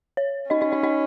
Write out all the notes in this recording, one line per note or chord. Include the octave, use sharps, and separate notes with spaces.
C#5
C#4 D#4 D#5
D#4 D#5
D#4 D#5
D#4 D#5